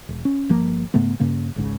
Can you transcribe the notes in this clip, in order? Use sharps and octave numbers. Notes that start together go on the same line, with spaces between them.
E1
C#4
G1 F3 A#3
G#2 C#3 A3 B3
G2 C#3 A#3 C#4
G#1 C#2 G#2 C#3